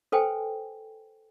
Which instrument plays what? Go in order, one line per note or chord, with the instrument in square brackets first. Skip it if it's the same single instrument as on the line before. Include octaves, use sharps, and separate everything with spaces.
[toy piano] A4 B4 C5 G5 G#5